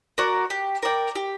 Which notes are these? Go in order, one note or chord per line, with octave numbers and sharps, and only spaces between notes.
F#4 A#4 D5
G4
A#4 D5 G5
G4